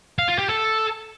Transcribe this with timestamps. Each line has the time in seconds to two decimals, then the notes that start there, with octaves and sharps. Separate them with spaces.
0.19 F5
0.29 F4
0.38 G4
0.48 A4